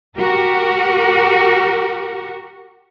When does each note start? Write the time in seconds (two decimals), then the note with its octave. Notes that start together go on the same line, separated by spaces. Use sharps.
0.17 F#4 G4 A#4